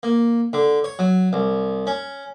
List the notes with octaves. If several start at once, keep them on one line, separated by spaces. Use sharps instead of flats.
A#3
D3
C#5
F#3
C2
C#4